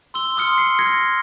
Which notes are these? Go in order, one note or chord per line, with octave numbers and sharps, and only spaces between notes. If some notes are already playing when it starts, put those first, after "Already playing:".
C6 E6 G7
C6 D#6 F6 C#7
C7 C#7 G7
F6 G#6 A#6 C#7